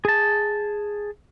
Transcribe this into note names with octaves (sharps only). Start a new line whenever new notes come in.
G#4 A5